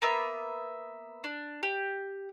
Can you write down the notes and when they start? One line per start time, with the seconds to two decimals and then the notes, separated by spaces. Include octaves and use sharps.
0.02 A#3 B3 E5
1.24 D4
1.63 G4